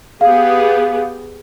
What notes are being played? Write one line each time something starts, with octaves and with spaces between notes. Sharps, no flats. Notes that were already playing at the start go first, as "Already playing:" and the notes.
B3 G4 G#4 F5